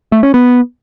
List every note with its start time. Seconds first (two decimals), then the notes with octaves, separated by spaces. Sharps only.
0.12 A3
0.23 C#4
0.34 B3